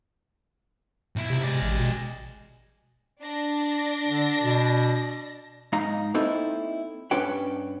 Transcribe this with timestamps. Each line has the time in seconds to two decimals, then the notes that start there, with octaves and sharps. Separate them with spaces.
1.16 B1 E4
1.30 C3
1.43 G#3 D5
1.62 A1
1.79 B2
3.24 D4 A#6
4.09 D3
4.42 B2
5.73 G#2 D#4 F5 A#5
6.14 A#3 C4 D#4 E4 A4
7.11 G2 C#4 D4 B4 C#5 G5